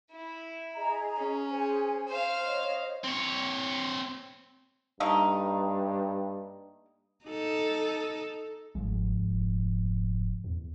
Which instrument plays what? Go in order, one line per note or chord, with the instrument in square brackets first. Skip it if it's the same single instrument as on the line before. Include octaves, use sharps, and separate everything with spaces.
[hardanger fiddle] E4
[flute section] G#4 D#5 A#5
[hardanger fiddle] C#4
[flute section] G#4 C5 G#5
[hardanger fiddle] C5 F5
[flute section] C#5 D#5
[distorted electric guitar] C4 C#5
[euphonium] G2 [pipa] A3 A#3 D#4
[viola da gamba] D#4 A4
[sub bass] G1 [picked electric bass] G#2 F3 G#3
[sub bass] F1
E2